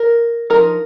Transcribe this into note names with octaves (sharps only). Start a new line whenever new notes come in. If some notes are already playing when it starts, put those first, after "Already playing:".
Already playing: A#4
F3 D#4 A#4